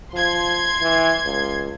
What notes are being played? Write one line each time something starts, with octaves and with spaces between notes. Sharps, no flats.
F3 C6 G#6
E3
C#2